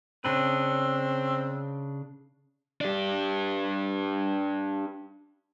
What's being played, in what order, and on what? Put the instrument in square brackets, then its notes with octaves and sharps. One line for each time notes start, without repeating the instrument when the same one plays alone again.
[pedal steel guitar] C#3 D4 B4 [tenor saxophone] C4
[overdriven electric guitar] D4 G4